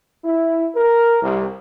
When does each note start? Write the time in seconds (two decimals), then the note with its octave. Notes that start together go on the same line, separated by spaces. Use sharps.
0.24 E4
0.75 A#4
1.21 C2